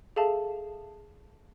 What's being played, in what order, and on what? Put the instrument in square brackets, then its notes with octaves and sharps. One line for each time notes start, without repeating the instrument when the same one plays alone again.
[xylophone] G#4 A4 E5 F5 A5